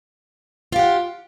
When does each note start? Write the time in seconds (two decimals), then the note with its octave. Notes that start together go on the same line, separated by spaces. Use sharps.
0.72 F4
0.76 G4
0.79 F#5